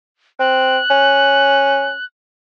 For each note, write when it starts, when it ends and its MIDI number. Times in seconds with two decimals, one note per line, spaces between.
0.39 0.78 60
0.39 2.05 90
0.90 1.92 61